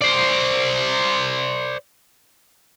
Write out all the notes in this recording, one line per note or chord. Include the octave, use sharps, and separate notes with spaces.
C5 D5